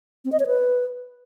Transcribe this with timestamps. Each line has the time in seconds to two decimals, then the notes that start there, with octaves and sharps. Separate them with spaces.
0.25 C4
0.32 D#5
0.39 C#5
0.47 B4